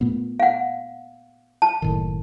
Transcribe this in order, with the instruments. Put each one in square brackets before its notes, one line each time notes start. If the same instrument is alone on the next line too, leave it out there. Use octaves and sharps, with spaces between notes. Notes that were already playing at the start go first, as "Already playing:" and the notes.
[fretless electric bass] A#2 A3 B3
[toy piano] F5 F#5
A5
[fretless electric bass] F#1 A2 D#3